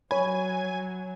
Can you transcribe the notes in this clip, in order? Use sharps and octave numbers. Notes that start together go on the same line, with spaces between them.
F#3 C#5 G#5 B5